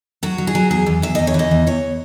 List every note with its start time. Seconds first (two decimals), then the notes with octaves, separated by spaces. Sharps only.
0.23 F#3 F#4
0.38 F#3
0.47 G#4
0.55 F#3
0.71 E2 G#4
0.86 E2
1.02 E2 E5
1.15 E2 D#5
1.27 C#5
1.34 E3 D#5
1.51 E2
1.67 E2 C#5